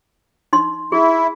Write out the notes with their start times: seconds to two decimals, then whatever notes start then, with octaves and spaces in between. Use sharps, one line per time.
0.53 D#4 C6
0.92 E4 G#4